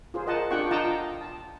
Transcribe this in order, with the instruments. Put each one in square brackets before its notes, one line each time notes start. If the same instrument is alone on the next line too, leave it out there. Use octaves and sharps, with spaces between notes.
[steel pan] F4 G#4 C5
A#4 D#5 F#5 A5
D4 F4 G4 F#5 G5 C#6
F4 D#5 F#5 G5 A5 A#5
A5